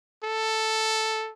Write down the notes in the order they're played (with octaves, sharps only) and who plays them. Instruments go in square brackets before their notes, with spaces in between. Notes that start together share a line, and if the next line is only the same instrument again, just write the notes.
[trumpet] A4